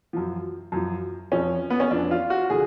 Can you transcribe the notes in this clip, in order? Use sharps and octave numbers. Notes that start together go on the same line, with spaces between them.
F#2 F3
F#2 F3
F2 F3 C#4
B3
C#4
F2 F3 D4
F4
F#4
D3 F3 G#4